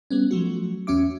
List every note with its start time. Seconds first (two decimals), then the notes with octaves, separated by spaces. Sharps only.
0.11 G3 B3 C#4
0.31 F3 F#3 A3 F#4
0.87 E2 C#4 F#4 E5 D6